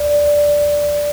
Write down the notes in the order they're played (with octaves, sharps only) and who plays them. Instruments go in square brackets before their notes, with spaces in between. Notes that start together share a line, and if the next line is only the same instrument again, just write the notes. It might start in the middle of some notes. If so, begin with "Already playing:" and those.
Already playing: [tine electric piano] D5